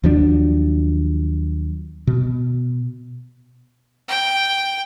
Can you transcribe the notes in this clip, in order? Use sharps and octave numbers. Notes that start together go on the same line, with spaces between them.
D#2 F3 F#3 D4
B2
G5